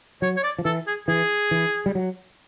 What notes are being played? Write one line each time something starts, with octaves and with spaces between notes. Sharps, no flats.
F#3 C#5
C#5
D5
F3
E3 A4
G#4
E3 G#4
E3
G3
F#3